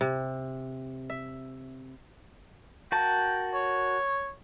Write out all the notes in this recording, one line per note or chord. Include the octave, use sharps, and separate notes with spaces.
C3
E5
F#4 A#4 G5 A5
C#5